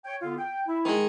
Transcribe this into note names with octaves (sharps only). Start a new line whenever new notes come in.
C#5 G5
D3 B3 F4
G5
E4
D#3 G#3